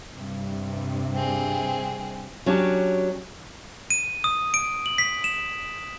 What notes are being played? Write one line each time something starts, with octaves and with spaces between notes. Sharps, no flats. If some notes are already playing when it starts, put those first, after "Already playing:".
G2 C3
C4 G#4
F#3 C#4 D4 G4
D#7
D#6
D7
F#7
B6
E7